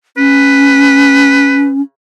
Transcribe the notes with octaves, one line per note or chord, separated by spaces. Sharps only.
C#4 B4